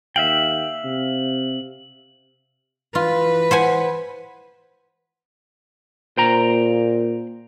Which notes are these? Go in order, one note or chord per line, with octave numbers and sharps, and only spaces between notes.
D#2 E5 F5 G5 F#7
C3
E3 F4 B4
C5 F#5 G#5
A#2 C5 G5 A#5